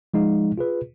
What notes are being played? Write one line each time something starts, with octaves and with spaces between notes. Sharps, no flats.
F3 G#3 D#4
F4 G#4 B4